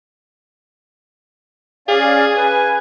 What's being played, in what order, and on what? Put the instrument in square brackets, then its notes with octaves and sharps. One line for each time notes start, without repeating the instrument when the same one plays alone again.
[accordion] C#4 D5 F5 [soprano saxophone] G#4
[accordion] B4 [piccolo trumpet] G#5